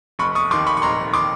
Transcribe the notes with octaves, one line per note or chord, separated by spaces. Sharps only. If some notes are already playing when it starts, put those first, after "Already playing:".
F1 B5 C#6
C#6 D#6
D#2 D#3 C6 D6
B5 C#6
C#6
F1 A#5 C6
D#3 C6 D6